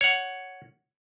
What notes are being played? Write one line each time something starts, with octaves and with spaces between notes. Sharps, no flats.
C#5 F#5